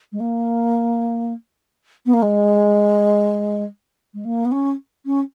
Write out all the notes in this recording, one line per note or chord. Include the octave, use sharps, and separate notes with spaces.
G#3
A#3
B3
A#3
G#3
G#3
A#3
B3
C#4
C#4